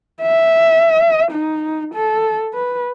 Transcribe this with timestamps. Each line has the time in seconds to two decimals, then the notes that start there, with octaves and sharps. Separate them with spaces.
0.22 E5
1.32 D#4
1.94 A4
2.54 B4